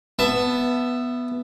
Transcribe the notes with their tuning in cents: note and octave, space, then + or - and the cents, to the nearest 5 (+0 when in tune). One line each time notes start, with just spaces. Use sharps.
B3 +0 E5 +15 A5 +0